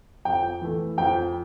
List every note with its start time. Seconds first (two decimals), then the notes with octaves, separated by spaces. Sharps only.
0.25 F2 G5
0.62 E3 A3
0.98 F2 G5